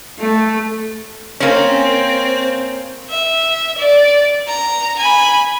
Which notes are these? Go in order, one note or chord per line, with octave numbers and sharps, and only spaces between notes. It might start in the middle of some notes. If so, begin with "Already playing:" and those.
A3
A#3 C4 C#4
E5
D5
A#5
G#5 B5